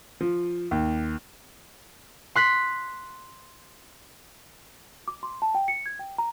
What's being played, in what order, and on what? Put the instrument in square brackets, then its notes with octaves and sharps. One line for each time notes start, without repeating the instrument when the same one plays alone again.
[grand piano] F3
D#2
[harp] C6 F#6 B6
[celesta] D6
C6
A5
G5
C#7
G#6
G5
A#5